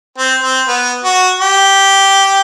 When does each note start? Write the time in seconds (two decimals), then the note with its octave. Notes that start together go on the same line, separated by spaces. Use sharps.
0.18 C4
0.43 C4
0.68 B3
1.04 F#4
1.41 G4